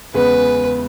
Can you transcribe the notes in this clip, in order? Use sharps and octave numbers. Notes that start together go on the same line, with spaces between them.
E2 C#3 G#3 B3 B4